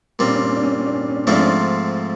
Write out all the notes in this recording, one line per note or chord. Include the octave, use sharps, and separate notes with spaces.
A#2 G3 C4 C#4
D4
C#4
D4
C#4
D4
C#4
D4
C#4
D4
C#4
D4
C#4
D4
C#4
G#2 F3 A3 C4 D4 F4
C#4
D4